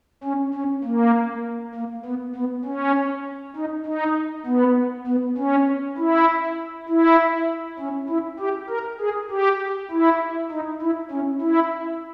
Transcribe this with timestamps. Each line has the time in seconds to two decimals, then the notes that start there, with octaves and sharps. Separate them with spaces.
0.24 C#4
0.54 C#4
0.84 A#3
1.75 A#3
2.06 B3
2.36 B3
2.65 C#4
3.56 D#4
3.86 D#4
4.46 B3
5.07 B3
5.38 C#4
5.98 E4
6.89 E4
7.79 C#4
8.09 E4
8.39 G4
8.69 A#4
9.00 G#4
9.30 G4
9.91 E4
10.51 D#4
10.82 E4
11.11 C#4
11.41 E4